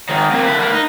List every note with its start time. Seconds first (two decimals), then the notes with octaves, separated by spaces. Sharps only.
0.09 G#2 D#3
0.31 C3 A#3
0.45 D3 E4
0.60 A#3 B4
0.72 D#4